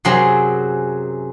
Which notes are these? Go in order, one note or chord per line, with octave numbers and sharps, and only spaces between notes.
F#2 C3 F#3 C4 G#4